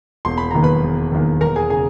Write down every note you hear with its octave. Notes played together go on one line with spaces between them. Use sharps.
E1 C6
B5
D#2 D#3 A#5
B4 B5
E1
D#2 D#3
E1 A#4 A#5
G#4 G#5
C#3 G#4 G#5